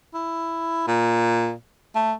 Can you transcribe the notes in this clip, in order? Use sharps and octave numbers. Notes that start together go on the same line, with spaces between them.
E4
A#2
A3